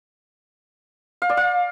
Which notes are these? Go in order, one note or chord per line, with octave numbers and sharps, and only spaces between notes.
F5
D5
F5